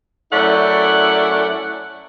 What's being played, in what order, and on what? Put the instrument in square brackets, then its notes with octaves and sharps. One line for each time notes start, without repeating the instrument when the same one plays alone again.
[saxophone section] F#2 A3 C#4 E4 D5 F#5